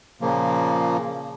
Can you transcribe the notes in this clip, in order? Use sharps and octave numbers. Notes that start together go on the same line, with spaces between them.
A#2 C#3 F3 A#3